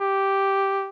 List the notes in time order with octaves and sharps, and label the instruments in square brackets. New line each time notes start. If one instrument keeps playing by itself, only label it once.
[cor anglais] G4